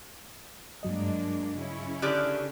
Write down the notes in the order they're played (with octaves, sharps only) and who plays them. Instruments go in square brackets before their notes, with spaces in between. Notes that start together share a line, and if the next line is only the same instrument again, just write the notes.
[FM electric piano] G2 F#3 D#5 [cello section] G#3 A#3 D4
[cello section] C#3 C#4 E4
[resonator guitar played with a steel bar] D3 G4 D5 [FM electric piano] D#6 F6 F#6